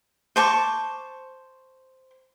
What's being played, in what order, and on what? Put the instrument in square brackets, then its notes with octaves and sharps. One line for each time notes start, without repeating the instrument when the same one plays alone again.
[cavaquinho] C5 A5 C#6 D6